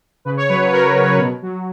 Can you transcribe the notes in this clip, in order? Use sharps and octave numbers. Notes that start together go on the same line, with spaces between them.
C#3 B4
C#5
F#3 B4
B4
C#3 A#4
F#3
B2
F#3